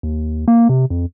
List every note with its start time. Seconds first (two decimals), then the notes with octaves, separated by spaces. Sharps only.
0.03 D#2
0.48 A#3
0.69 C3
0.90 F2